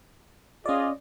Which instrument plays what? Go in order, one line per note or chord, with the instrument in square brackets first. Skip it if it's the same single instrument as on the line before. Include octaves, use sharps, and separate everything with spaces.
[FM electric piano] C#4 D5 [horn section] F4 G#4 D#5